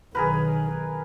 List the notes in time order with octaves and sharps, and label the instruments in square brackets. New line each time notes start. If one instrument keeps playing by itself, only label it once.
[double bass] B1 D#3 [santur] G#4 A#4 B4